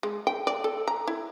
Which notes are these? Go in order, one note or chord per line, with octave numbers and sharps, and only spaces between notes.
G#3
G5
D5
A4
A#5
E4